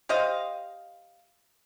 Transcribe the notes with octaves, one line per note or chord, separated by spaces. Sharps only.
G4 C5 D#5 F5